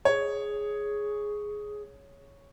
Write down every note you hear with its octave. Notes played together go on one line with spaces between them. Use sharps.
G#4 C#5